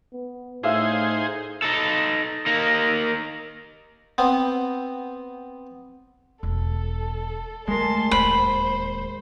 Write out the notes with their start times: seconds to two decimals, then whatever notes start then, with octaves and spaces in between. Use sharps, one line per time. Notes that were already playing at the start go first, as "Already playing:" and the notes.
0.13 B3
0.63 A2 D#4 G#4 C5 E5 F5
1.62 D#4 A4
2.46 A#3 D#4
4.18 B3 C4
6.43 E1 A4
7.67 D2 G#3 A#4 A5 C6
8.11 D1 D#2 C5 B5